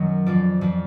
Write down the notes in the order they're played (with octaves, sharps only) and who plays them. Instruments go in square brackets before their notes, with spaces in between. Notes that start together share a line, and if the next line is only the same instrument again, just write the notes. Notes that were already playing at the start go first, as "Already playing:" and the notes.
Already playing: [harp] F#2 D#3 F#3
F2 F3 D5
F2 F3